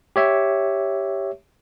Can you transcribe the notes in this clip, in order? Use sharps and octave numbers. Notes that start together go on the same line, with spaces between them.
G4 C#5 E5